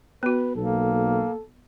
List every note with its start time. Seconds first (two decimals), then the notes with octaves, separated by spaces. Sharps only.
0.23 B3 F#4 B4
0.56 B1 A#3 A4